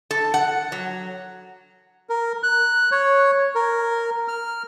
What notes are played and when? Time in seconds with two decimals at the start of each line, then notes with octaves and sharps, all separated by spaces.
0.11 A4
0.34 F#5
0.72 F#3
2.09 A#4
2.43 F#6
2.91 C#5
3.55 A#4
4.28 F6